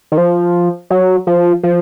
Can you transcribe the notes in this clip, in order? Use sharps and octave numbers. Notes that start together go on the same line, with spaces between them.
D#3
F3
F#3
F3
F3